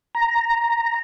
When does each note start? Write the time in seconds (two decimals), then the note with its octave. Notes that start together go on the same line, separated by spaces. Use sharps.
0.15 A#5